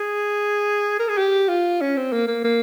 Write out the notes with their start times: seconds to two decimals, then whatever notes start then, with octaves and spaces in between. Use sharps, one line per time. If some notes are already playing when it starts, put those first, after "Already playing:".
Already playing: G#4
0.99 A#4
1.09 G#4
1.18 G4
1.49 F4
1.81 C#4
1.97 C4
2.13 A#3
2.28 A#3
2.44 A#3